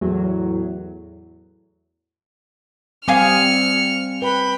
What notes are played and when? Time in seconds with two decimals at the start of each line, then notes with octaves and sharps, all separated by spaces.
0.01 E2 A2 F#3
3.08 G3 C4 F5 G#5 D#6 F6 C#7
4.22 B4 G5 B5